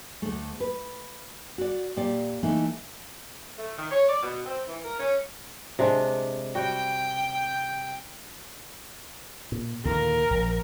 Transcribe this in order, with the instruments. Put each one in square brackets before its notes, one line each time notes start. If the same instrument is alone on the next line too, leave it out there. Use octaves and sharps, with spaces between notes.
[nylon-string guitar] D2 A3
B4
F#4 D5
A#2 G4 D5
E3 A3 A#3 D#4
[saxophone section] A3
D#3
C#5
D5
B2
C4
E3
A#4
C#4
[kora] C3 G#3 D4
[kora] G3 F#4 [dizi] G5
[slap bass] A#2
[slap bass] D#2 A#2 D3 [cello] A#4
[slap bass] A#1